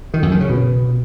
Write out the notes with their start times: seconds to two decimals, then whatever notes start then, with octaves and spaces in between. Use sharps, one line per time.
0.14 D#3
0.23 F#2
0.32 D#3
0.40 C#3
0.49 B2